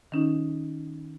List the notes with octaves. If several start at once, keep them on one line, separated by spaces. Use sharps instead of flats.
D#3 C#4 D#4